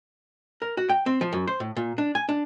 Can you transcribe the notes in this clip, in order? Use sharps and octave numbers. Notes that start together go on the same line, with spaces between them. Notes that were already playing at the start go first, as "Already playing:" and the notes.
A#4
F#4
G5
C4
F3
F#2
C5
A2
A#2
D4
G#5
D4